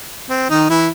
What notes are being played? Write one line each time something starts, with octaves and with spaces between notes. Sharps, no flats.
C4
D#3 D#4
E3 E4